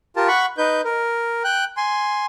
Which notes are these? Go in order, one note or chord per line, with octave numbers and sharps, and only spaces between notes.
F4 G4 A#4 A5
F#5 B5 C#6
D#4 B4 G6
A#4
G5 F#6
G#5 C6